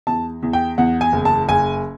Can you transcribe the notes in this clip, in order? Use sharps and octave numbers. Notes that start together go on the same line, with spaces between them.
E2 A5
E2
G5
E2 F#5
G#5
F#1
A5
F#1 G#5